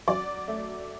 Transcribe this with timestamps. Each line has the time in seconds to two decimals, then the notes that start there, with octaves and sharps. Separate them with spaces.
0.08 F#3 D5
0.48 A3